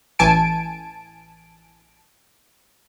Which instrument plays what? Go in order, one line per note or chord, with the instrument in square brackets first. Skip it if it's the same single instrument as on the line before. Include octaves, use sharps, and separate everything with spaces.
[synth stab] A1 E3 G#5 A5 D7